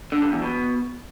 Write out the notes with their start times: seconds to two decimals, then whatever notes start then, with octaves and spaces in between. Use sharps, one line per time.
0.12 D3
0.22 G2
0.32 E2
0.42 B2